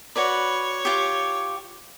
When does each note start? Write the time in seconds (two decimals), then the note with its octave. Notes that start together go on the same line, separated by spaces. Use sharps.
0.16 F#4 B4 C#5 D5
0.85 F4 G4